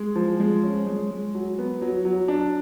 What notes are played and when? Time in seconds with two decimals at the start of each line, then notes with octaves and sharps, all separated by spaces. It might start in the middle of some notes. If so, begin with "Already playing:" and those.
Already playing: G#3
0.16 F3
0.40 G#3
0.63 C#4
0.86 G#3
1.11 G#3
1.34 F#3
1.58 B3
1.81 F#3
2.05 F#3
2.28 D4